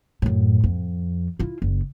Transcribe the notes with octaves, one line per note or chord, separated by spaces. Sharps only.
F#2 A2
F2
E4 F4
F#1